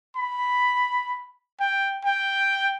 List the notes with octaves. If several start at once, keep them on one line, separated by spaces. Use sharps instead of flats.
B5
G5
G5